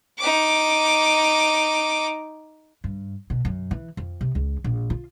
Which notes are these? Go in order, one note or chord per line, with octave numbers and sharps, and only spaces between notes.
D#4 D6
G2
B2
F#2
E3
F2
C3
C#2
A#1
F4